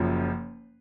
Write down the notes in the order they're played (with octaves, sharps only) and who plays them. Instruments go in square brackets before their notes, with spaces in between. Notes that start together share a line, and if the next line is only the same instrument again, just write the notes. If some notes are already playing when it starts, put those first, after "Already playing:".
Already playing: [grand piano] F#1 F#2 F3